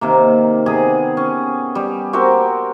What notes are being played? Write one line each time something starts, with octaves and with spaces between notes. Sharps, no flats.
C3 D#3 A#3
C3 B3 G4 G#4
C#4
G3
C4 F#4 G4 A#4